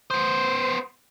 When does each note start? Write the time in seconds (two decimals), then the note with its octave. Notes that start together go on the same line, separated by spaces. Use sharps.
0.11 B3 C5